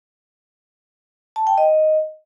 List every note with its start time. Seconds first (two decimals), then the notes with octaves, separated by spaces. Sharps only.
1.36 A5
1.47 G5
1.58 D#5